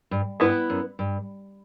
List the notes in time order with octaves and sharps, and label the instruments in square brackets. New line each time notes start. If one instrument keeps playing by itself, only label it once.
[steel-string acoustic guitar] G2
[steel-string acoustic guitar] G2 [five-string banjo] B3 E4 B4
[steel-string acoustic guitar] F#2
G2